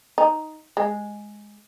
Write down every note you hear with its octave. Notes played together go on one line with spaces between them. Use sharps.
D#4
G#3